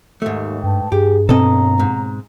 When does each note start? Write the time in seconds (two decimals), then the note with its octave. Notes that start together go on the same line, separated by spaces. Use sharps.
0.22 D#2 G#2 A3
0.63 G2 B4 G5 A5
0.92 G2 G4 G#4
1.29 D#2 B2 C4 A4 D#5 A#5
1.79 G#2